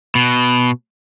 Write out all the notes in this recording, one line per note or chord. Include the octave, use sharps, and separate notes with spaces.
B2